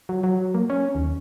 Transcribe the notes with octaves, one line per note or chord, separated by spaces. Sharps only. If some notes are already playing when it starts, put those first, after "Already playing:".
F#3
F#3
A#3
C#4
D#2